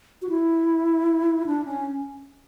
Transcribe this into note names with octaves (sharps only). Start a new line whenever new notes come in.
F#4
E4
D4
C#4